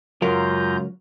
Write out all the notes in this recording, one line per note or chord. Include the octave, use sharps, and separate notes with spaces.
C#2 F#2 F#3 F4 A#4 A#5 G6